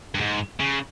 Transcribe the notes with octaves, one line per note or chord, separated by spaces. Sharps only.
G2
G#2
C#3